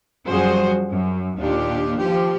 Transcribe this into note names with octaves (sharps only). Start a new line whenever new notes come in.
F#2 F3 G3 F#4 G#4 C5
F#2
D#2 A#2 D4 F4 G4
F3 G4